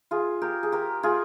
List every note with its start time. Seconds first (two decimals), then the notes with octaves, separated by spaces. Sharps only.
0.11 F4 G#4
0.42 G4 A#4
0.63 G#4
0.72 G4 A#4
1.03 F4 G#4